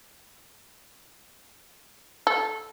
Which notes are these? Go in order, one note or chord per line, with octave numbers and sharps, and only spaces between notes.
A4